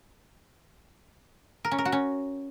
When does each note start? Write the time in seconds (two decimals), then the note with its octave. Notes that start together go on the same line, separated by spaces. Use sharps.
1.65 A#4
1.72 C#4
1.78 A#4
1.85 F#4
1.92 C#4